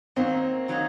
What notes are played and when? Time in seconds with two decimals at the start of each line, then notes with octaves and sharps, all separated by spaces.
0.16 D#3 F#3 A#3 C4 D#4
0.68 D#3 F#3 A#3 D#4